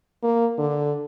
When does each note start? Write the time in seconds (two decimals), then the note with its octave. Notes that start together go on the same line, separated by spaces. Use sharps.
0.23 A#3
0.58 D3